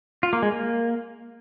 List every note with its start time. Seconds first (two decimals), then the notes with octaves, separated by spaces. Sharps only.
0.23 F4
0.33 A#3
0.42 G#3
0.52 A#3